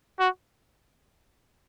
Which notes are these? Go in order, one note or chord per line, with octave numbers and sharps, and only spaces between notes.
F#4